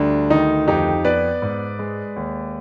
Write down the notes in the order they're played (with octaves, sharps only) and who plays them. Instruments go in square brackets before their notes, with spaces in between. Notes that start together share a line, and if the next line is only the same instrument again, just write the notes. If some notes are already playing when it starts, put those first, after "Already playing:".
Already playing: [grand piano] D2 G3 D4
D#3 D#4
F2 D#4 G4
B3 B4 D5
G#2
G#3
D#2